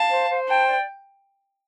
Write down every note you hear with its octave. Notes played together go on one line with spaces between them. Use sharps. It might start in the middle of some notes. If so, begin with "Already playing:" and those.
Already playing: F5 A5
C5
C5
G5 A5
D5